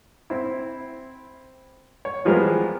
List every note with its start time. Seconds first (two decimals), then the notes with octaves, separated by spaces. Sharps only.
0.30 C4 E4
2.05 C#5
2.25 E3 F3 G3 G#3 B3 A#4